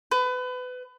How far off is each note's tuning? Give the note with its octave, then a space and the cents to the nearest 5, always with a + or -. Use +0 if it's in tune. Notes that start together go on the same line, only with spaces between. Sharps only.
B4 +25